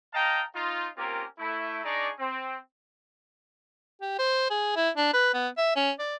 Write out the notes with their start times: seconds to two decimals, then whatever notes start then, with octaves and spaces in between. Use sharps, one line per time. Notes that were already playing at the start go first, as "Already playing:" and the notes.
0.14 D#5 F5 G5 A5 A#5
0.54 D#4 F4
0.97 A#3 C4 C#4 F4 G4 A#4
1.38 A3 E4
1.83 D4 D#4 G#4 D5 A#5 C#6
2.19 C4
4.01 G4
4.19 C5
4.50 G#4
4.76 E4
4.97 D4
5.14 B4
5.34 B3
5.58 E5
5.76 C#4
5.99 D5